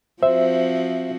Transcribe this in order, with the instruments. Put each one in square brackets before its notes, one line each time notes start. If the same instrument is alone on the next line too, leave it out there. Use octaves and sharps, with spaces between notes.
[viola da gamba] F3 C4 F#4 [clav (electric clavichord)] C5 [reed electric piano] E5